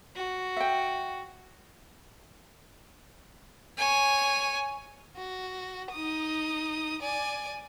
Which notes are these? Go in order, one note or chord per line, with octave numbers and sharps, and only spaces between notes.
F#4
E5 G5
C#5 G#5
F#4
D#4 D#6
D5 G#5